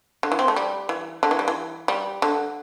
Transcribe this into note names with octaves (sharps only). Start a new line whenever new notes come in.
D3
E3
C4
A3
G3
E3
D3
E3
G3
E3
G3
D3